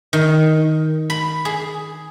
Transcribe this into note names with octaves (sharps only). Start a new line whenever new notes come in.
D#3
B5
G#4